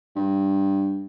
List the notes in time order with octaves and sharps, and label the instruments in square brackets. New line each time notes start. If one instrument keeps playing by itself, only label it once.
[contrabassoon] G2